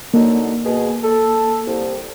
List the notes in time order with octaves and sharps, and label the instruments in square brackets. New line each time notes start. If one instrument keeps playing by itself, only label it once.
[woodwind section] D3 F#3 D#4 [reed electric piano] A#3
[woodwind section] B2 G#4
A4
C2